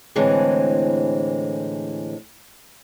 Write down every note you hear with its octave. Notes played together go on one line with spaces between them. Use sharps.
A2 D3 E3 G#3 C4